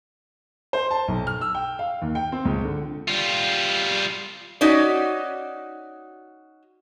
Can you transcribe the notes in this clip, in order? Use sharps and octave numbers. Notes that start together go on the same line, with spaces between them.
C5
A5
B1
F6
E6
G5
F5
D#2
G5
C4
C#2
D3
G3 F4
C#4 D#4 F#4 D5